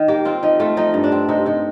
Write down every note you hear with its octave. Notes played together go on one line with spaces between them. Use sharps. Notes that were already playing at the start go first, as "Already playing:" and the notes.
Already playing: D#3
A#3 G4
C4 F4
F3 D#4
A3 F4
F3 D#4
G2
D4
C4
C3 D#4
C3 D#4